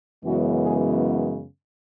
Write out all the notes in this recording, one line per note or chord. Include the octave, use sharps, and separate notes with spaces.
F#2 C#3 E3 G#3 B3 F#4
G#4